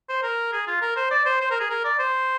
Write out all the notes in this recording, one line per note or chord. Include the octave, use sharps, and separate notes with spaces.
C5
A#4
G#4
F4
A#4
C5
D5
C5
C5
A#4
G#4
A#4
D5
C5